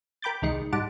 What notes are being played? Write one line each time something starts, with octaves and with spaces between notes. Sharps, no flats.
A#4 G5 B5 D6 G6 A6
C2 D#3 G#3 C#7
G#2 G3 F#5 A5 D6